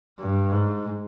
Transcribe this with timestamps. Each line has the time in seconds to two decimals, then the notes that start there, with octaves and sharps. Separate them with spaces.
0.19 G2
0.52 G#2